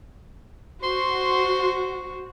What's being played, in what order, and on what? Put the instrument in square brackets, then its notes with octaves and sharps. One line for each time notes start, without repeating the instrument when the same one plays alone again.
[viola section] F#4 [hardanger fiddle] C5 C#6 [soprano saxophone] C6